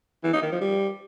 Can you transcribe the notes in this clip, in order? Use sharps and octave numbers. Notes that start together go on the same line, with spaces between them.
E3
D#4
D#3
F3
G3